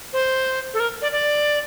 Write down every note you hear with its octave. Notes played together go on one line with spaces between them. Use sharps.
C5
A4
A#4
D5
D5